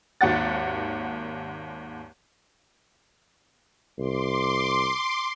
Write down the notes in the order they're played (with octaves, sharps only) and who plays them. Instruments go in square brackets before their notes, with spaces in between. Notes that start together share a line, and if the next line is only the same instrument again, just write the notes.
[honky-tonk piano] G#1 D#2 F#4 F#5 A6
[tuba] C2 [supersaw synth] C6 D6